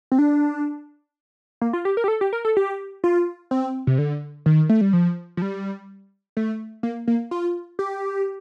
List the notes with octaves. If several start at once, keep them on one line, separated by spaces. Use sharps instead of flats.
C4
D4
A#3
F4
G4
A#4
G4
A4
G4
A#4
A4
G4
F4
C4
C3
D3
D#3
A3
G3
F3
F3
G3
A3
A#3
A#3
F4
G4